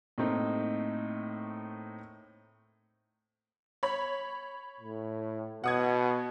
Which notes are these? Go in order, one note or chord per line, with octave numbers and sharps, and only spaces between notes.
A2 A3 A#3 C4 D#4
C#5 B5
A2
B2 F#5 D#6 G#6